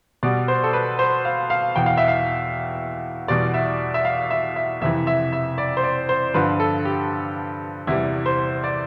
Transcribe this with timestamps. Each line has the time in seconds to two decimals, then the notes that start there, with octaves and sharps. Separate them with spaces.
0.23 B2 G3 B3 D5
0.48 C5
0.64 A4
0.73 B4
0.99 C5
1.25 F5
1.50 F5
1.75 E2 B2 B3 G5
1.86 F5
1.97 E5
2.08 F5
3.28 E2 B2 G3 D5
3.54 E5
3.94 E5
4.05 F5
4.30 E5
4.56 E5
4.82 F2 C3 E3 E5
5.07 E5
5.33 E5
5.58 D5
5.77 C5
5.83 D5
6.09 C5
6.34 G2 D3 F3 B4
6.60 A4
6.85 G4
7.87 E2 C3 E3 G3 E4
8.26 C5
8.64 D5